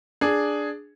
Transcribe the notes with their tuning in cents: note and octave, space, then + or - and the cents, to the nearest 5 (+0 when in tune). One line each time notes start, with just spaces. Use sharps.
D4 +0 G#4 +0